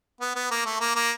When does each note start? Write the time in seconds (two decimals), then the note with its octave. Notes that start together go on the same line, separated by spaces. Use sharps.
0.20 B3
0.35 B3
0.51 A#3
0.66 A3
0.80 A#3
0.95 A#3